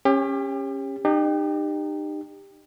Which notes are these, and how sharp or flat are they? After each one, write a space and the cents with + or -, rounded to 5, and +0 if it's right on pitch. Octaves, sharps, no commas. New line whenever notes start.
C#4 -15 G4 +30
D#4 -35 G4 +15